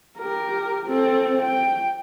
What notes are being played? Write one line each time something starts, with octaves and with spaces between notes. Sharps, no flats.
G4 A#4
C4 A4
G5